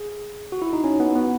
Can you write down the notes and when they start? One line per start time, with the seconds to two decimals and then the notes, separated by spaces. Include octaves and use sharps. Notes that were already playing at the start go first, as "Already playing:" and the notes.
Already playing: G#4
0.52 F#4
0.62 E4
0.73 D#4
0.84 C#4
1.00 B3
1.16 B3